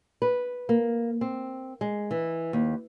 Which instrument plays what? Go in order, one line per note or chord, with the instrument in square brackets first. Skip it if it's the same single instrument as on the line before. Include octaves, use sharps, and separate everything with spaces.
[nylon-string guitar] B4
A#3
C4
G#3
E3
D#2